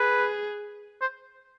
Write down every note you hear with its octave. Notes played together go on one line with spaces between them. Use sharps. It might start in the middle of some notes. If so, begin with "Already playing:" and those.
Already playing: G#4 B4
C5